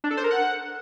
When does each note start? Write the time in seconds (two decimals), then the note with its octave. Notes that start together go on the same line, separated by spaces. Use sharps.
0.04 D4
0.11 A4
0.17 C5
0.24 A#4
0.31 F#5